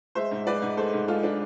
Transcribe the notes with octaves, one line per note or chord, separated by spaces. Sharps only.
G#3 C5 E5
G#2
G#3 B4 D5
G#2
G#3 A4 C5
G#2
G#3 F4 A4
D4